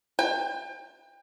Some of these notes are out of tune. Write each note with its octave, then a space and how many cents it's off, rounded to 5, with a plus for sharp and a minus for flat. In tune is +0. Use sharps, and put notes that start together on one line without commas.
G5 +30